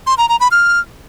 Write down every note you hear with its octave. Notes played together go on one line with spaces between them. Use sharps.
C6
A#5
A#5
B5
F6